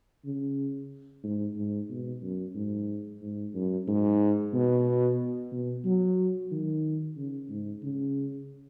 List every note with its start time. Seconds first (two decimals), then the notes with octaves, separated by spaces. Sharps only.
0.25 C#3
1.24 G#2
1.57 G#2
1.90 B2
2.22 F#2
2.55 G#2
3.22 G#2
3.54 F#2
3.88 G#2
4.53 B2
5.52 B2
5.85 F#3
6.51 D#3
7.17 C#3
7.49 G#2
7.83 C#3